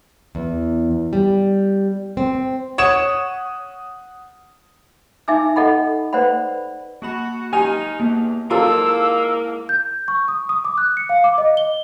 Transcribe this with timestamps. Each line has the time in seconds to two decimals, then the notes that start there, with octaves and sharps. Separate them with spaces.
0.35 E2
1.13 G3
2.17 C4
2.78 C#5 F#5 D#6 E7
5.28 D#4 E5 G#5 D6 E6
5.56 A4 D#5 F#5 B5
6.13 B4 C5 D5 F#5 B5
7.02 A#3 F#4 B5
7.53 D#4 G4 G#5 F6 F7
8.00 E2 A#3
8.50 G#2 A#3 E4 F4 A4 A5 A#5 E6
9.69 G6
10.08 C#6
10.28 D#6
10.49 D#6
10.65 D6
10.78 F#6
10.97 C#7
11.09 F5
11.24 D6
11.38 D#5
11.57 G7